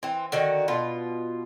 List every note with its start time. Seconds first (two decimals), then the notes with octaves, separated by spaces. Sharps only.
0.03 E3 C4
0.32 D3 D#3 F#4
0.68 B2 F4